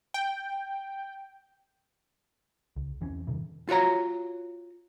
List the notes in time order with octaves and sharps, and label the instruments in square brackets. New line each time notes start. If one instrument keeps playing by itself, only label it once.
[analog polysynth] G5
[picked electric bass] C#2
E2 E3 C4 C#4
G2 C3 D#3 E3
[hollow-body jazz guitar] F4 F#4 C#5 A#5